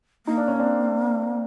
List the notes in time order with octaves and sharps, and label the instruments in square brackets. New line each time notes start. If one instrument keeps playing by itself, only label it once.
[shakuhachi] A#3 [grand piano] D#4
[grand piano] D4
C#4
C4 D4